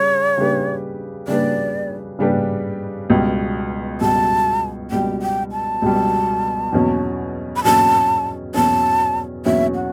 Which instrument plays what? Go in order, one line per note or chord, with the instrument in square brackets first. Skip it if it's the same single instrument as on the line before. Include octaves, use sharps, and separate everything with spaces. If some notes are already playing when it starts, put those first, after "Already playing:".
Already playing: [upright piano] C#3 G3 [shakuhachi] C#5
[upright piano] C#3 G3 D4 G4 B4
[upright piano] C#3 G3 D4 G4 B4 [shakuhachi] D5
[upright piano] C#3 G3 D4 G4 B4
C#2 B2 G3
[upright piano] C#2 B2 G3 [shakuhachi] A5
[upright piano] C#2 B2 G3 [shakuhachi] G5
[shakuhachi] G5
A5
[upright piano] C#2 B2 G3
E2 B2 F#3 C#4
[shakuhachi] B5
[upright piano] E2 B2 F#3 C#4 [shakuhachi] A5
[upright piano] E2 B2 F#3 C#4 [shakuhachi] A5
[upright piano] E2 B2 F#3 C#4 [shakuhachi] E5
[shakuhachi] F#5